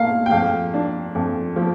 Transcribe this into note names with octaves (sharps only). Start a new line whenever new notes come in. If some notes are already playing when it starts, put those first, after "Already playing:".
Already playing: A#2 A#3 F5
G5
F2 F5
D4
F2
F3